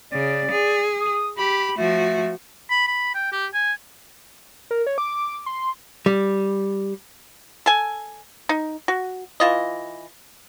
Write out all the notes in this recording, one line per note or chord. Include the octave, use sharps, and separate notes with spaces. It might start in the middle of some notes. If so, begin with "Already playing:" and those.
C#3 D5
G#4
D#6
G4 B5
F3 A3 F#4
B5
B5
G5
G4
G#5
A#4
C#5
D6
C6
G3
A4 G#5
D#4
F#4
E3 F4 D#5